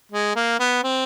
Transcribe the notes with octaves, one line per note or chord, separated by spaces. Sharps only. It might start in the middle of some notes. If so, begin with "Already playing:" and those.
G#3
A#3
B3
C4